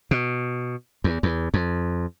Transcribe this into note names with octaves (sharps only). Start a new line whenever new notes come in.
B2
E2
E2
F2